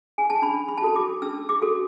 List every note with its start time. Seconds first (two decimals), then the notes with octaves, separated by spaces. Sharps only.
0.18 G#5
0.30 A5
0.42 D4 B5
0.68 B5
0.78 A5
0.82 F#4 A4 B5
0.96 D6
1.22 D4 E6
1.49 D6
1.62 F#4 A4